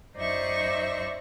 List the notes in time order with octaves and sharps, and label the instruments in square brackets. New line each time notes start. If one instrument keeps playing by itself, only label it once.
[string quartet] F#2 D#4 C5 D5 E5 C#6